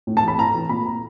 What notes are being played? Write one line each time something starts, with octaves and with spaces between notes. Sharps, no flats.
A2
A5
E3
B5
A2 A#5
E3
A#2 B5
A#5